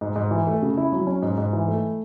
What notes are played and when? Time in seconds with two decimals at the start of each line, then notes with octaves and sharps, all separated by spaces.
0.01 G#2
0.16 G#2
0.31 E3
0.47 A3
0.62 C#3
0.77 E4
0.92 F#3
1.07 C#4
1.22 G#2
1.38 G#2
1.53 E3
1.68 A3